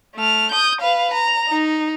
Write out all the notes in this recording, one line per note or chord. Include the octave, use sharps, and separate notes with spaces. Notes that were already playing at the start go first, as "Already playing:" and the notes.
A3 F6
D#6 G6
B4 F5
A#5
D#4